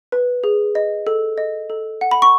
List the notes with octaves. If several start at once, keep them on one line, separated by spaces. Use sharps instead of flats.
B4
G#4
D#5
A4
D#5
A4
F#5
B5
C#6